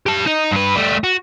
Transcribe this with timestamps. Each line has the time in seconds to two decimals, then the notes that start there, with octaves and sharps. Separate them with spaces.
0.06 G4 A5
0.26 D#4 D#5
0.51 G2 B4
0.76 G3 A3
1.04 F#4